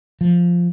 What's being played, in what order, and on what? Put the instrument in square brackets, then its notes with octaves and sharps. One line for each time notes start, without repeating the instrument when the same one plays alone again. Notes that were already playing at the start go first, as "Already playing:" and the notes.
[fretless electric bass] F3